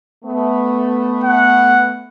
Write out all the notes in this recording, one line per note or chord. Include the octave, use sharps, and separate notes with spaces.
A3 B3
F#5